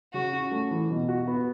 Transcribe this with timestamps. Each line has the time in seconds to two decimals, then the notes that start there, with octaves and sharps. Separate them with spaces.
0.13 C#3 F#4
0.33 C#4
0.51 A3
0.71 E3
0.90 B2
1.09 F#4
1.27 B3